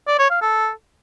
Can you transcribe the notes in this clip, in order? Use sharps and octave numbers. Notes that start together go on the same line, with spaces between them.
D5
C#5
F5
A4